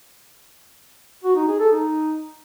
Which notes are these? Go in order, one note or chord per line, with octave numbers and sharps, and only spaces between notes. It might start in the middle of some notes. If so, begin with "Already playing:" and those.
F#4
D#4
G#4
A4
D#4